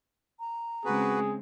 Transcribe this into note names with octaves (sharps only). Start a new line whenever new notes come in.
A#5
C#3 G#3 C4 F#4 G#4 B4